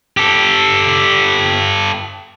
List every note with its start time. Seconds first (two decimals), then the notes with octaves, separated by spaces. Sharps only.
0.17 G4 A4